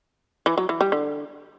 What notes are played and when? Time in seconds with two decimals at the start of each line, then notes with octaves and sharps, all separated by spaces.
0.46 E3
0.58 F#3
0.69 E3
0.81 G3
0.92 D3